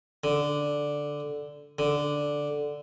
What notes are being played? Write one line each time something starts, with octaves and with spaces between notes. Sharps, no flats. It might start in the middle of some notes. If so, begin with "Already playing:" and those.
D3
D3